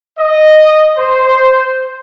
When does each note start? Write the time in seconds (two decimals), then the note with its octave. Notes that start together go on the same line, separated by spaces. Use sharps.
0.19 D#5
0.98 C5